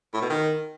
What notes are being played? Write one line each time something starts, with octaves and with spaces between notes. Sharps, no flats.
A2
B2
D#3